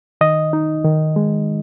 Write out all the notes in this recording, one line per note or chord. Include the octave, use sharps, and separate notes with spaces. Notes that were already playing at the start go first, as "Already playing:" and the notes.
D#3 D#5
D#4
D#3
G#3